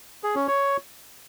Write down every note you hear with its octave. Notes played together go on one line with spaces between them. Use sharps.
G#4
C#4
C#5